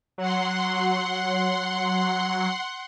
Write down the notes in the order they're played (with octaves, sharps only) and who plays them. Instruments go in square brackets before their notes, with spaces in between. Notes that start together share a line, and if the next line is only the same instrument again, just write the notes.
[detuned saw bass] F#3 [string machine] F#5 C6